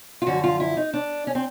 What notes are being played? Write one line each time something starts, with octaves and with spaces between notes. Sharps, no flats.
F4
F#2 D3 F3 F#4
F4
E4
D#4
D4
C#4
C4